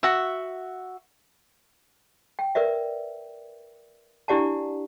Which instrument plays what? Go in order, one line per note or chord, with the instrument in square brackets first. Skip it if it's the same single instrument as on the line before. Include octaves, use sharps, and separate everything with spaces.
[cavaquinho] F#4 E5
[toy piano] G5
A#4 B4 D5 E5
D4 E4 G4 D5 F#5 A5